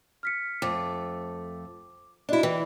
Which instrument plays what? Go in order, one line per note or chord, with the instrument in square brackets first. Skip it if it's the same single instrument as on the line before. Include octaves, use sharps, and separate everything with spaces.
[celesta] F6 B6 C#7
[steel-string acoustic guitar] F2 A3 [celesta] D6
[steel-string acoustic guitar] D4 E4 [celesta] F#4 D#5
[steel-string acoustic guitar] E3 [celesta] G5